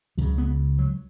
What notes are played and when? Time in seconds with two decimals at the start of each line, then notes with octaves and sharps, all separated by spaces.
0.18 C#2 C#3 F#3
0.38 B3
0.79 F#3